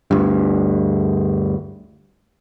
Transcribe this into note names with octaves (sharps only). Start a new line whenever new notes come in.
D2 G2